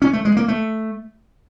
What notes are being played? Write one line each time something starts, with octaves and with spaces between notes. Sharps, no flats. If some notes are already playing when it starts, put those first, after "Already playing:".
C#4
A3
G#3
A#3
A3